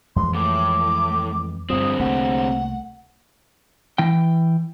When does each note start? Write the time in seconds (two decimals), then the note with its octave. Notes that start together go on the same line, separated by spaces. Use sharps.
0.16 F2 E3 G#3 C6
0.35 A2 D6
1.70 G2 D3 F3 C4 D#6
2.00 C2 A3 A#3 F#5
3.98 E3 G5